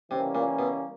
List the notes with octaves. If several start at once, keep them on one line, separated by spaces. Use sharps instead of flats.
C3 E3 G3 A#3 C#4
A#2
B2